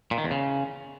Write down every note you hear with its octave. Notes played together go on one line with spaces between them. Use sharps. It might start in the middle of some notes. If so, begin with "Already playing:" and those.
A#2
D#3
E2
C#3